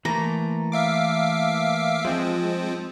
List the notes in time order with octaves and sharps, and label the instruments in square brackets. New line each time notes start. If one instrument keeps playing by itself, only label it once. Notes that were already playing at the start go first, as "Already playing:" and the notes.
[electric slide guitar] E3 A3 A#3 [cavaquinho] A#5
[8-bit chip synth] E5 F5 D6
[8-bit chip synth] F3 C4 [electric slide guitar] G#3